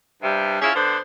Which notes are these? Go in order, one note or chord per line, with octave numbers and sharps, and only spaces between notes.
G2 C3 G3
C#4 E4 F4 G#4
D3 B3 C5